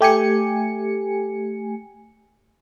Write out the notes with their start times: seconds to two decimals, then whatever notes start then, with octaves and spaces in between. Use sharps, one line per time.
0.01 A3 G4 G#5 C#7